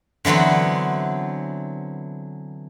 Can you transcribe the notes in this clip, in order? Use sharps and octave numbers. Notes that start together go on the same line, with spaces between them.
D3 E3 F#3 B3 C4